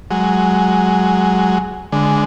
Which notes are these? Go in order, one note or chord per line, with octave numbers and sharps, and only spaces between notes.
F#3 G#3
D3 G#3